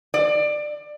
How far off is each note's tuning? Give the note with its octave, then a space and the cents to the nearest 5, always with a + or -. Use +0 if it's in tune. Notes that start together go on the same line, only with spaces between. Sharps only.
D5 +20